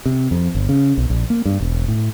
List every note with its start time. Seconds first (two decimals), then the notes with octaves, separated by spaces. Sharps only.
0.06 C3
0.31 F2
0.55 G1
0.69 C#3
0.97 B1
1.10 A#1
1.30 A#3
1.45 G2
1.60 E1
1.88 A2